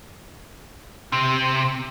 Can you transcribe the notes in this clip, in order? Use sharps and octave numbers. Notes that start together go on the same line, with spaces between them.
C3